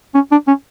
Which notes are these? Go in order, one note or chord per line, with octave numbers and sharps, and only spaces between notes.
C#4
D4
C#4